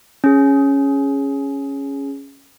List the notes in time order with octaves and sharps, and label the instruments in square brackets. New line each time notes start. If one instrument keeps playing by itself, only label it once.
[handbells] C#4 G#4